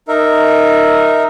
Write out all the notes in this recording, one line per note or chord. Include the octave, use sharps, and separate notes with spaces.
D#4 A#4 E5